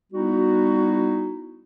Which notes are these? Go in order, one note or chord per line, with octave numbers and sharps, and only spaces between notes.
G3 B3 D#4 E4 F#4